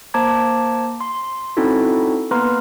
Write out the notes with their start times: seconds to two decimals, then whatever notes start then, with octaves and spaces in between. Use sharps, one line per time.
0.14 A#3 C5 A5 A#5 D6 G#6
1.01 C6
1.57 C4 C#4 D#4 E4 F#4 A4
2.31 A#3 B3 B4 A#5 C6 F6